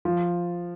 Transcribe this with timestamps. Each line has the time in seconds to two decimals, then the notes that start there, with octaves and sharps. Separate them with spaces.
0.05 F3